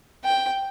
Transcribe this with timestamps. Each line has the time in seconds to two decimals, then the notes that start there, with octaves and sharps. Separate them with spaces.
0.25 G5